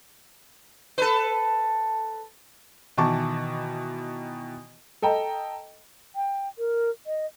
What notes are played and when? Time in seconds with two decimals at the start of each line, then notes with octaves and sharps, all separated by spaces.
0.98 A4 B4
2.98 B2 D#3 E3 A5 C#6 D6
5.02 A4 D#5 G5 A#5
6.16 G5
6.59 A#4
7.07 D#5